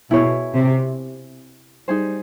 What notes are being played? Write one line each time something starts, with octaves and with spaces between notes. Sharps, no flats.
B2 E4 G#4 C#5
C3
G3 D#4 G#4 C5